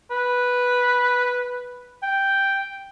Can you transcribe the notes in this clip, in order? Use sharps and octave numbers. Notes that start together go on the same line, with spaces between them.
B4
G5